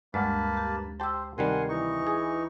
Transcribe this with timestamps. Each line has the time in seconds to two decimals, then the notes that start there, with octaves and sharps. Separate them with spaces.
0.14 D2 G2 G#3 A#3 B4 A5
0.53 G4 A#5
1.00 G4 C5 G5 A5 E6
1.38 C3 D#3 G3 A#4 F#5 G#5 C6
1.69 E3 D#4 C#6
2.07 G#4